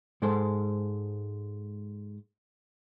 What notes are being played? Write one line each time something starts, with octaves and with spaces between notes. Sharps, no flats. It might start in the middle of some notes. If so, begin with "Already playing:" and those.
G#2 G#3 A4 C5 C6